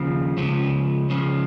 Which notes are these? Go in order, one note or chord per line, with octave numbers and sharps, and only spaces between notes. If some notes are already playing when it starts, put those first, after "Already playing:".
Already playing: D#2 C#3 F3
C#2 C#3 F3
C#2 C#3 F3